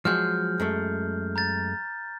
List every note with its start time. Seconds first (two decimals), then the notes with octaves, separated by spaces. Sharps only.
0.05 F3 F#3 G#3 F6 G6
0.60 F#2 G#3 A3
1.36 A#5 G6 A6